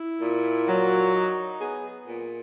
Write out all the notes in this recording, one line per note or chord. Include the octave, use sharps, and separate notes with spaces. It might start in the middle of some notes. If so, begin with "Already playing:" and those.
Already playing: E4
A#2
F#3
D#4
B3 G#4
A#2